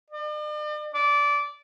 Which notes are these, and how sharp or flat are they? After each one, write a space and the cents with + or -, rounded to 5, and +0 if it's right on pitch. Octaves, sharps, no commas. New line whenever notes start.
D5 +45
D5 -20